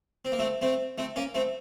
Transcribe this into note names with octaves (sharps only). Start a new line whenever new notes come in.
C4
A#3
A3 C4
A3 C4
A3 C4
A#3 C#4
A3 C4